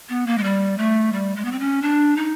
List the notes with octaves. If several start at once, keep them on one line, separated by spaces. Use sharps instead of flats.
B3
A#3
G#3
G3
A3
G3
G#3
B3
C4
C#4
D4
D#4